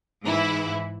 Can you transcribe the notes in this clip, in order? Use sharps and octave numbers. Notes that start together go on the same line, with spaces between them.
G#2 E3 E4